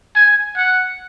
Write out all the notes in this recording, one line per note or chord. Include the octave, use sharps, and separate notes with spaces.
G#5
F#5